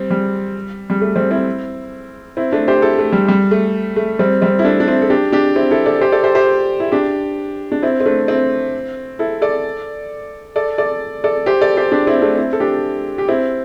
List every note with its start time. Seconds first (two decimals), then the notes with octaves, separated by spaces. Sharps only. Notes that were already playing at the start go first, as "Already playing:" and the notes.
Already playing: G3 C4
0.11 G3
0.90 G3
1.01 A3
1.16 G3 C4
1.31 C4 E4
2.37 C4 E4
2.52 A3 D4
2.68 G4 C5
2.82 E4 A4
2.99 A3
3.12 G3
3.28 G3
3.51 A3
3.96 A3
4.19 G3 C4
4.42 G3 C4
4.59 E4
4.65 A3 D4
4.80 D4
4.87 C4 E4
5.02 A4
5.10 D4 G4
5.32 D4 G4
5.55 C4 E4
5.71 E4 A4
5.86 A4 D5
6.01 G4 C5
6.12 A4 D5
6.24 G4 C5
6.35 G4 C5
6.80 E4
6.92 D4 G4
7.72 D4
7.82 C4 E4
8.00 C4
8.06 A3 D4
8.28 C4 E4
9.19 E4 A4
9.42 A4 D5
10.56 A4 D5
10.78 A4 D5
11.24 A4 D5
11.46 G4 C5
11.61 A4 D5
11.77 G4 C5
11.92 D4 G4
12.07 C4 E4
12.22 A3 D4
12.37 C4 E4
12.53 A4
12.60 D4 G4
13.18 G4
13.28 C4 E4